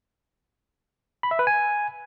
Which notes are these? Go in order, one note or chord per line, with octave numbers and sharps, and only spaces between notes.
B5
E5
B4
G#5